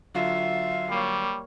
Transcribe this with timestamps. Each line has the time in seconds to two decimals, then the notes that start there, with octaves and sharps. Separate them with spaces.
0.15 D3 F#3 F4 E5 F5
0.90 G3 A#3 C#5